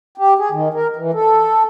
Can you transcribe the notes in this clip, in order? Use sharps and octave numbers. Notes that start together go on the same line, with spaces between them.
G4
G#4
D#3
A#4
E3
A4